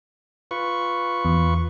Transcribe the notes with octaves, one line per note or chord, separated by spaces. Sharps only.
F4 B4 C#6
E2